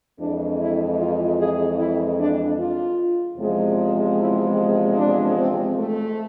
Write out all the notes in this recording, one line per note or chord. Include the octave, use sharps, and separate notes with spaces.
F2 E3 G#3 D4
E4
F4
G#4
E4
D4
F4
E2 C3 F3 G#3
E4
D4
C4
A3